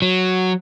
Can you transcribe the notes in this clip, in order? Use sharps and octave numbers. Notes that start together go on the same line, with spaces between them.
F#3